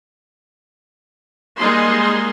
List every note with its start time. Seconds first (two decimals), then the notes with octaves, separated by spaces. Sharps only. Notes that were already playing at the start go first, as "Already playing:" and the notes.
1.58 G3 G#3 A#3 D#4 G#4 C6